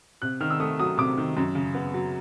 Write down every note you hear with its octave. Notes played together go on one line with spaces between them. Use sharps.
C3 F#6
D#3 F6
E6
A3 D#6
F#3 D#6
C3 D6
D#3
F#2
C#3
B3
F#3